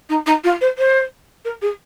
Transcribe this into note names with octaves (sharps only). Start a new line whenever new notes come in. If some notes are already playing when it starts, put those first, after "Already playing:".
D#4
D#4
F4
C5
C5
A#4
G#4